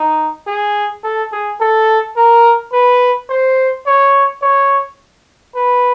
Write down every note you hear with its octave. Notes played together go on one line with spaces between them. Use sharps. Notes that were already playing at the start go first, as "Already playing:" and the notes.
Already playing: D#4
G#4
A4
G#4
A4
A#4
B4
C5
C#5
C#5
B4